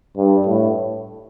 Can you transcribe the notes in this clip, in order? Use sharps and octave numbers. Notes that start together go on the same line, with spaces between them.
G2
A2